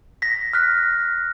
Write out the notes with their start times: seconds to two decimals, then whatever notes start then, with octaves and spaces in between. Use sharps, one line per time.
0.22 A#6 B6
0.53 F6 F#6 B6